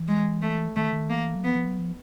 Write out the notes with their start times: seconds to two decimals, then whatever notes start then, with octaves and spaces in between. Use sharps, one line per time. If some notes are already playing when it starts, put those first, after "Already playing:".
Already playing: E3
0.08 G#3
0.42 A3
0.76 D#3 A3
0.92 D#3
1.09 E3 A#3
1.35 F#3
1.44 F3 B3
1.55 F3
1.67 F#3
1.79 F3